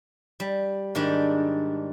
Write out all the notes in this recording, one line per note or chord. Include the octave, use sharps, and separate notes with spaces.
G3
G#2 D#3 G3 D4